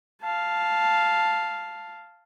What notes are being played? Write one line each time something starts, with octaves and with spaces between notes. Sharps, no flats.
F5 A5